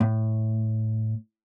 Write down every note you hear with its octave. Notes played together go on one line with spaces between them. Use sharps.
A2